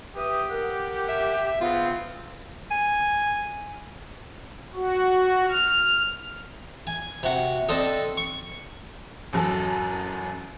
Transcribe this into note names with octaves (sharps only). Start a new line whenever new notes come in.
G4 B4 E5 D#6
A#4 F#5
E5
C#3 B3 C4 F4
G#5
F#4
F6
G#5
C3 F#4
C4 D4 A4 D#5
C#6
A1 F#2 F#3 A4 A5